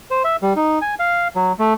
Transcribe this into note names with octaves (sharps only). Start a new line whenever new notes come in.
C5
E5
G3
D#4
G#5
F5
F#3
A3